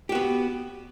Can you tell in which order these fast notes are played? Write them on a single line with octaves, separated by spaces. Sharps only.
G4 F#4 B3